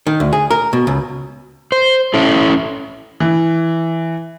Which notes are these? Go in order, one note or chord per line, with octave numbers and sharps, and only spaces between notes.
D#3
D2
G#4
A#4
B2
C#2
C5
C#4 E4 A4
E3